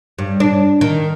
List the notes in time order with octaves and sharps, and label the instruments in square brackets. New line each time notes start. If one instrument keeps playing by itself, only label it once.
[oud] G2
D4
D#3